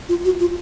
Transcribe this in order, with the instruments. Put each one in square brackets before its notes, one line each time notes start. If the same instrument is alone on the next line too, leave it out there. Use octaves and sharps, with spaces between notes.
[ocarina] F4
F#4
F4